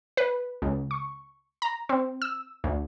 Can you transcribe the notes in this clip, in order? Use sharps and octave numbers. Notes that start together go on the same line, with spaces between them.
B4
C#2
C#6
A#5
C4
E6
D2